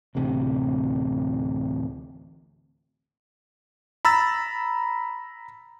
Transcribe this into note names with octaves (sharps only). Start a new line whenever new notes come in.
A1 D2 C3
A#5 B5 E6 A6